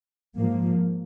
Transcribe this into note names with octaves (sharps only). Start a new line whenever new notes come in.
G#2 F3 A#3